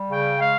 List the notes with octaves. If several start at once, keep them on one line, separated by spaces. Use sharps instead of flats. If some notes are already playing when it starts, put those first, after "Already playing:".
Already playing: G3
C#3 G5
G#3 F5